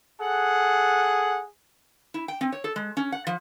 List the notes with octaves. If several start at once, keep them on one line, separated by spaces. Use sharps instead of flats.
G#4 A4 F#5
E4
G5
C4
C#5
A4
G#3
C#4
F#5
F3